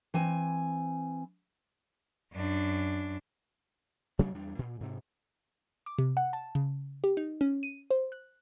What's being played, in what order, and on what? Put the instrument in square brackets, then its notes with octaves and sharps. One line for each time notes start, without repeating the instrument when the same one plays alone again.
[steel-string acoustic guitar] E3 C4 G#5
[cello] F#2 D4
[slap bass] C3 F#3 A3 D4
E2 G3 D4
A#2
G#2 C3
[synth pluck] D6
C3
F#5
A5
C#3
G4
D#4
C#4
D#7
C5
F#6